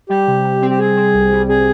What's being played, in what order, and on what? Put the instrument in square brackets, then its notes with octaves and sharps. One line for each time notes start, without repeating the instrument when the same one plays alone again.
[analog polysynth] G3 [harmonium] G4
[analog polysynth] C3
C3
C4
[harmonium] G4
[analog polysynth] C4 [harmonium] G#4
[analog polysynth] C4
C2
G3
[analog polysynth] C3 [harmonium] G#4